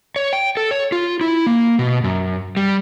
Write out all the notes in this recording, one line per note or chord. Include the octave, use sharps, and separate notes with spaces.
C#5
G5
A4
C#5
F4
E4
A#3
B2
F#2
G3